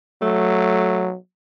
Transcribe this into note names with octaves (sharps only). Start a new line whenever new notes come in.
F#3 A3